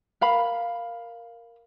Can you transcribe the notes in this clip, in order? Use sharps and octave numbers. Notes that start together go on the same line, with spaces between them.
A#4 F5 B5